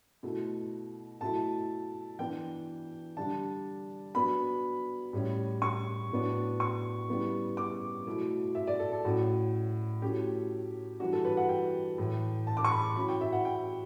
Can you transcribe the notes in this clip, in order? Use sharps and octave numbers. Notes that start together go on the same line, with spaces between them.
B2 A3 E4
B2 F#3 A3 E4 A5
E3 B3 D4 G5
D3 G3 D4 A5
F#3 B3 D4 B5
A2 G3 C#4 E4
C#6
A2 F#3 B3 D4
C#6
C#3 G3 B3 E4
D6
B2 F#3 A3 E4
E5
D5
A4
A4
A2 F#3 C#4 F#4
F#3 A3 C#4 E4 G4
E3 G3 D4 F#4
A4
B4
F#5
G5
A2 E3 A3
A5
D6
C#6
B5
F#3 C#4 E4 B5
G5
E5
F#5
G5